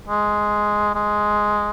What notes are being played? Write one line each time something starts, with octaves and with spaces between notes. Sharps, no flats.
G#3
G#3